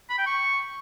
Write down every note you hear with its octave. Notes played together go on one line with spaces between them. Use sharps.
B5
G5
C#6